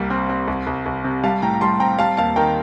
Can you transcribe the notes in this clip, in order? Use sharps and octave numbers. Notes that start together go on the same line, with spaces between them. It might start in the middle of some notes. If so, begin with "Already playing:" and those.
Already playing: C2 G3 A#3
C4
C4
C2
C2
C2
C3
G3 F5 A5
A2 G5 A#5
A#5
G3 A5 C6
C4 G5 A#5
G3 F5 A5
D#2 F5 A5
D#3 G5 A#5